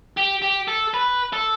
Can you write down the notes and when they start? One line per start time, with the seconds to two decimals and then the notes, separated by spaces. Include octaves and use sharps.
0.17 G4
0.42 G4
0.68 A4
0.94 B4
1.33 A4